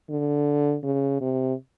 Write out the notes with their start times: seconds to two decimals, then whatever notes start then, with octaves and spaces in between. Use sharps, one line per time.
0.10 D3
0.83 C#3
1.21 C3